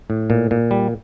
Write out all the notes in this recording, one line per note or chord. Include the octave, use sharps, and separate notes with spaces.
A2
A#2
A#2
G3